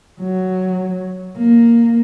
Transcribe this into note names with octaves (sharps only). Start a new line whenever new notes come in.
F#3
A#3